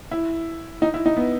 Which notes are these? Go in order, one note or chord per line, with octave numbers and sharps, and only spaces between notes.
E4
D#4
E4
D#4
B3